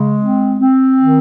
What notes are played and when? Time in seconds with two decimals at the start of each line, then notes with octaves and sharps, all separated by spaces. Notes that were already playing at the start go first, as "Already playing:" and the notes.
Already playing: C#3 G#3
0.20 C4
0.59 C4
1.00 D#3